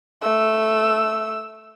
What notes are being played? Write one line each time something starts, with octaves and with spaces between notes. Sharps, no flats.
A3 E6